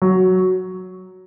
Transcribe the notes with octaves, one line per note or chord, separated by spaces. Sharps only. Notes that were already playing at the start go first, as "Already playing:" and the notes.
F#3